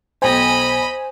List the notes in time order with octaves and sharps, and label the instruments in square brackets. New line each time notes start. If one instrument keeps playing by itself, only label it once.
[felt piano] B1 G5 [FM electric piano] C5 G#5 [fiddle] D#5 B5